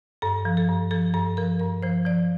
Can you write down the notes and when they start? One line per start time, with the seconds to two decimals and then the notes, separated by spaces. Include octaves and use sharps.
0.22 G2 A4
0.45 F3
0.57 A4
0.69 G2
0.91 F3 A4
1.14 G2 A4
1.37 F3 A#4
1.60 G2 A#4
1.82 F3 C5
2.05 F3 D5